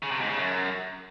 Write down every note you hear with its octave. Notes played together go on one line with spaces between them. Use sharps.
C#3
C3
G#2
C#3
F#2